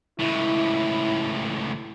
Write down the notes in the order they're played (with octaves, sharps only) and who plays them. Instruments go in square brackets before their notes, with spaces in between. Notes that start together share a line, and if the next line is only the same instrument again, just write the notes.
[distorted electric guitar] C#2 A2 [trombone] E4